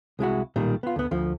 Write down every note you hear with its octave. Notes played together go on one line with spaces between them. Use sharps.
C2 G#3 E4 F#4
B1 A#2 D#3 G3
B3 F4
D2 B3
D2 F3